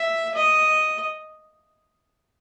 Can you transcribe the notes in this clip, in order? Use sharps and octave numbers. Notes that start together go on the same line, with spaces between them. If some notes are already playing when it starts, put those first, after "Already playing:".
Already playing: E5
D#5